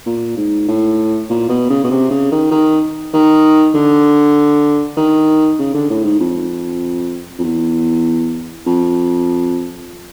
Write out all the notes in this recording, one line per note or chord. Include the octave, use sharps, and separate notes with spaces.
A#2
G#2
A2
A#2
B2
C#3
B2
C3
C#3
D#3
D#3
D#3
D3
D#3
C#3
D3
A2
G#2
F2
F2
E2
F2